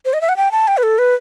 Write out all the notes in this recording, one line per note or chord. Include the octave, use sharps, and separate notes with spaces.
C5
D#5
E5
F#5
G5
A5
G5
B4
A4
B4